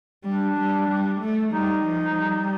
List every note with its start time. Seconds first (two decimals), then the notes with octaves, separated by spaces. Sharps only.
0.24 G3 D4
0.57 G3
0.88 G3
1.21 A3
1.52 G3 D#4
1.85 F3
2.17 G3